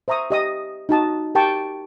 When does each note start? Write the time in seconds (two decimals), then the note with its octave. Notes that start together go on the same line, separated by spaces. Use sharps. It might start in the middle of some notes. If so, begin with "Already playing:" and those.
0.08 C5 E5 A#5 C#6 D#6
0.30 G4 D#5 D#6
0.89 D#4 F#4 A5 D#6
1.35 G4 A#4 G5 A5 C#6